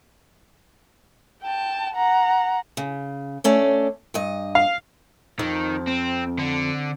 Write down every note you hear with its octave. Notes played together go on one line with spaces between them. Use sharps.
G5 A5
F#5 A#5
C#3
A3 C#4 D4
G2 D#5
F5
F2 D#3
C4
D3